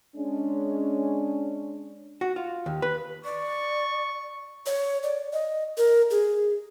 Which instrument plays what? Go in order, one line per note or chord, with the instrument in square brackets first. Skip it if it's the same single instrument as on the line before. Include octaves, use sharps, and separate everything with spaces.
[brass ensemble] G#3 C#4 D4
[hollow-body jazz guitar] F#4
F4
D#2
B4
[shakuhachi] D5 [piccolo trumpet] C#6
[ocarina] C#5
D5
D#5
A#4
G#4